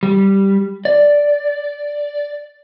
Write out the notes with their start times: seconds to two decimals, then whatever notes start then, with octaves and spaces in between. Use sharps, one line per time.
0.03 G3
0.85 D5